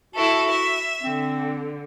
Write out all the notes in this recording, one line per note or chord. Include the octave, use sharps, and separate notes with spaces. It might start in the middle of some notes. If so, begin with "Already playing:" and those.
E4 F#4 A4
E5
D3 C4